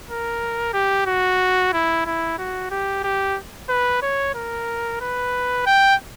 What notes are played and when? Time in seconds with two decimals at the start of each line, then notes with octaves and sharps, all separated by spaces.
0.09 A#4
0.73 G4
1.06 F#4
1.73 E4
2.06 E4
2.39 F#4
2.71 G4
3.04 G4
3.69 B4
4.02 C#5
4.35 A#4
5.01 B4
5.66 G5